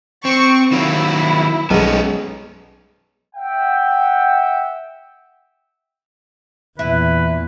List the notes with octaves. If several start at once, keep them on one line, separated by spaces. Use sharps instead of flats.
C4 C#6
D#3 F#3 A#3 E4
B1 G#3 B3 C#4
E5 F#5 G5
E2 A#2 E4 B4